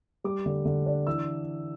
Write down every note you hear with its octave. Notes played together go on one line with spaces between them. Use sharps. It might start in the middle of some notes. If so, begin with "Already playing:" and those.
G3 D6
D3
D3
D4
E3 E6